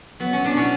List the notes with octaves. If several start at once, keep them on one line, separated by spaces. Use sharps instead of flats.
F#3 B3
F#3 C#4
B3 D4
B2 C#4 E4